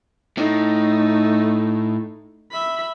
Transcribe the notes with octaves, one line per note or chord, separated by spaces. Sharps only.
A2 A3 D#4
E5 B5